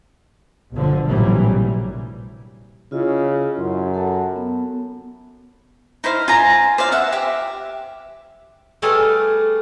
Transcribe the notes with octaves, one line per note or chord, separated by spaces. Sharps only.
G1 B2 D3 F3
A#1 A2 C3 E3 F#3 G3
C#3 E4 F4 D#5
F#2 C6
A4 F#5 A5
B3
D#4 E4 C5 F5
F4 G#5 A#5
C5 D5 F5
E5 F#5
G4 E5
G3 A3 G#4 A4 B4 F5